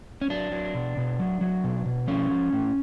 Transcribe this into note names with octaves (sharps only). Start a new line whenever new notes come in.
C#4
F#3 D4
F#3
B2
B2
F#3
F#3
B2
B2
F3 C#4
F3
A2